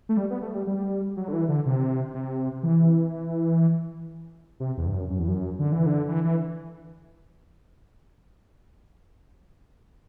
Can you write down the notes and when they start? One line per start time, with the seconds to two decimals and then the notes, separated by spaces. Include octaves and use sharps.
0.09 A3
0.17 G3
0.30 B3
0.42 A3
0.54 G3
0.67 G3
1.17 F#3
1.28 D3
1.33 E3
1.49 D3
1.66 C3
2.14 C3
2.63 E3
4.60 C3
4.77 E2
4.87 G2
4.94 F#2
5.10 F#2
5.19 E2
5.28 F#2
5.59 D3
5.72 E3
5.86 D3
6.08 E3
6.24 E3